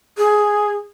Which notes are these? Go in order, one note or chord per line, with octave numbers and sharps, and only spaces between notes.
G#4